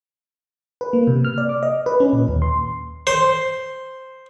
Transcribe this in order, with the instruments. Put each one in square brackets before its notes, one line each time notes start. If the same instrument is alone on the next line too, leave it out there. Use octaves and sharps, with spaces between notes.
[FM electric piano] B4
A#3
C3
F6
D5
D6
D#5
B4
C#4
A#2
D#2
C6
[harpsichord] C5